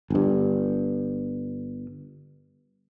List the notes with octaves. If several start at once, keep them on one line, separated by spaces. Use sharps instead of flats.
G1 G2